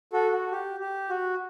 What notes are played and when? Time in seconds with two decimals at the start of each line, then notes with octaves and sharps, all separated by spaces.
0.13 F#4 A4
0.32 F#4
0.51 G4
0.80 G4
1.10 F#4